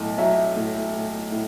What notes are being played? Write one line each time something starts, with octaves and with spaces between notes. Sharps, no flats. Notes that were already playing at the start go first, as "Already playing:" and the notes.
Already playing: B1 A2
F#3 E5
A2
A2
A2